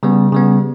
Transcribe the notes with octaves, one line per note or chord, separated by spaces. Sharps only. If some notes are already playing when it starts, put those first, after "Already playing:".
C#3 G3 B3
C#3 G3 B3